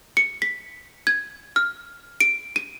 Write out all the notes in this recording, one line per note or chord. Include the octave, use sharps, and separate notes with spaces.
C#7
B6
G#6
F6
D7
D#7